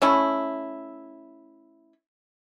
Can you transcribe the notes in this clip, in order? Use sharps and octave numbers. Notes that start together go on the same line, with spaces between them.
A3 C#4 E4